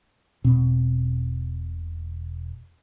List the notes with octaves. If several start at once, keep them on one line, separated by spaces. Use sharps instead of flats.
E1 B2 C4